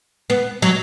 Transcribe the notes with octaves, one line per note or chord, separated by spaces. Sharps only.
B3
F#3